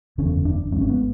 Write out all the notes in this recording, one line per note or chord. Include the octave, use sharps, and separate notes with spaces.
F#1 E2 D3 C#4
D4
G#1 G#2 C#4
C#4
B3